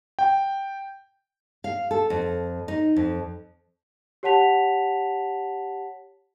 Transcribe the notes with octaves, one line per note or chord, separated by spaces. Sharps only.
G5
F5
A4
F2
D#4
F2
G4 C#5 F#5 A5 B6 F7